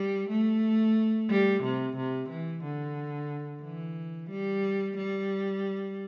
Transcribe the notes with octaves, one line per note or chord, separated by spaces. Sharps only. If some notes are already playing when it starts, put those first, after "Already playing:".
Already playing: G3
A3
G3
C3
C3
E3
D3
E3
G3
G3